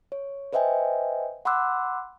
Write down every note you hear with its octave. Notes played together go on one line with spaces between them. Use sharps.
C#5
B4 C5 D#5 E5 G5 G#5
F#5 B5 C6 D6 E6 F#6